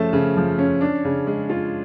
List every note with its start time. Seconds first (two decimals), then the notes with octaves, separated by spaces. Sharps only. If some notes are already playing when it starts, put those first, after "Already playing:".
Already playing: C#3 F3 A3 C#4 A5
0.13 C#3
0.37 F3
0.59 C#4
0.81 D4
1.05 C#3
1.27 G#3
1.50 F4